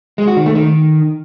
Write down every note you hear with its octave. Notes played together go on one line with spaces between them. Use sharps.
G#3
F#4
D#3
A3
D#3